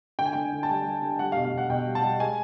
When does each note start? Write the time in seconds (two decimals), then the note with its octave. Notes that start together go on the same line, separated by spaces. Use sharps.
0.19 D3 G5
0.26 G#5
0.33 D3 G5
0.52 D3
0.63 A5
0.69 G3 G#5
0.86 G3
1.02 D3
1.19 G3 F#5
1.32 F5
1.37 B2
1.45 F5
1.53 B2 F#5
1.70 B2 G5
1.87 G3
1.95 A5
2.03 G3
2.20 G#3 G#5